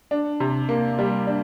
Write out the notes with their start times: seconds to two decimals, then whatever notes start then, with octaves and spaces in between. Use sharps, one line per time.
0.11 D4
0.40 C3
0.69 A#3
0.99 G3
1.27 D4